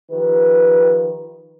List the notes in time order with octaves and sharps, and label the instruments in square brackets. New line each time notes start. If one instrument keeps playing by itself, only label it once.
[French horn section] D#3 F3 G4 B4